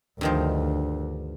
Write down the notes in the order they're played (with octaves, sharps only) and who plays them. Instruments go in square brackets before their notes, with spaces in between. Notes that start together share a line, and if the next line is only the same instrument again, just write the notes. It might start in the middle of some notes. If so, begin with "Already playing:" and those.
[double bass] D2 [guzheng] G2 D#3 F3